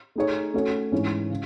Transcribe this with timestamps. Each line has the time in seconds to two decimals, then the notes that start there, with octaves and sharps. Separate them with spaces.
0.16 A3 D#4 G#4 C#5
0.54 A3 C#4 F#4 C#5
0.92 G#2 E3 G#3 C#4
1.30 C#3